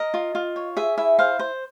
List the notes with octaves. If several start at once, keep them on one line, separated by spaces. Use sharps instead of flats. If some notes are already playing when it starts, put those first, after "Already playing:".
Already playing: A#4 D#5
F4
F4
C#5
G#4 E5
E4 E5
C5 F5
C5